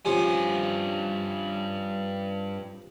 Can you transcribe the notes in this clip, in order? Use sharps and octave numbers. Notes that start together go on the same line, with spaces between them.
G2 C3 F3 C#4 G#5